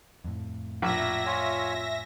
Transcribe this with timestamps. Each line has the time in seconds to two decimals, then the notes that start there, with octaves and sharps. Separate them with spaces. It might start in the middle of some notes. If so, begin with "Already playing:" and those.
0.24 F2 A2
0.82 A#1 E5 A#6
1.26 F4 C#5 G#5